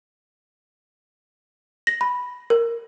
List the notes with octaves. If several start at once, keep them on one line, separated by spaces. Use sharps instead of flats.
A#6
B5
A#4